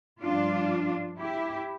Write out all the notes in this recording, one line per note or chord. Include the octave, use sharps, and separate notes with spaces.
G2 F3 D4 F4
E4 G4